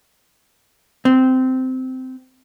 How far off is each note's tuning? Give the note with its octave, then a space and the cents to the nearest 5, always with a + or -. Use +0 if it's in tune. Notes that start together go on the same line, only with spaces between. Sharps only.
C4 -15